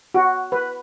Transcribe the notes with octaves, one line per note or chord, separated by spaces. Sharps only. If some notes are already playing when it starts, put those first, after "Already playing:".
F#4
B4